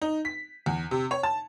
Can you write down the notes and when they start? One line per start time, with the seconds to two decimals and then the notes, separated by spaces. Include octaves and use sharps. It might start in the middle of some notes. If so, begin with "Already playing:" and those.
0.02 D#4
0.25 B6
0.66 E2
0.91 C3
1.11 C#5
1.23 A5